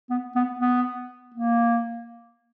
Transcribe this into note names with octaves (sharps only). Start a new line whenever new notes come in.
B3
B3
B3
A#3